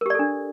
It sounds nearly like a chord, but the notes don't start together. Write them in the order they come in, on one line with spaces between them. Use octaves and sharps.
A#4 G4 D5 A4 D4